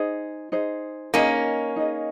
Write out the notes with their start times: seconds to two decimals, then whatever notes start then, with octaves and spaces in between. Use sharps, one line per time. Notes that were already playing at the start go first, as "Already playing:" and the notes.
Already playing: D#4 G#4 C5
0.52 D#4 G#4 C5
1.14 A#3 C#4 D#4 G#4 D#5
1.76 D#4 G#4 D#5